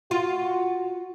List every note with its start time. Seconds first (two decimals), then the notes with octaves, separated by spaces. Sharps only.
0.11 F4 F#4